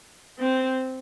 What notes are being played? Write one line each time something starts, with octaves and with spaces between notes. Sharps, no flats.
C4